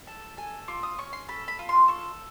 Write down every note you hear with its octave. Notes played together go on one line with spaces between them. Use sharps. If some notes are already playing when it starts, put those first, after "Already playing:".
A4 A5
A4 G#5
F4 D6
D#6
C#4 C#6
C6
A4 B5
B5
F4
C6
A4 C#6